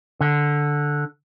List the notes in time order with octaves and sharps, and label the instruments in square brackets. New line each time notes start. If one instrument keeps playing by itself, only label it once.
[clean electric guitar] D3